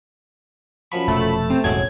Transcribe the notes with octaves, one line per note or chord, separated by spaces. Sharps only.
F#2 F3 B5 C#6
F1 B2 A3 A6 E7
C3 C4
E1 A1 F2 A2 F#3 G#3 G#6